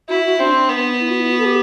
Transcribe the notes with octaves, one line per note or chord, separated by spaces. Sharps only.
E4 F#4
F#4
C4 D4
D4
B3
E4
F#4
E4
F#4
A4
G4